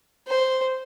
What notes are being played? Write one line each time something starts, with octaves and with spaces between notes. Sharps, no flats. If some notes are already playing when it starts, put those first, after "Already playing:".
C5